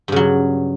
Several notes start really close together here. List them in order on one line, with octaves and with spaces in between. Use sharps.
G2 C#3 F#3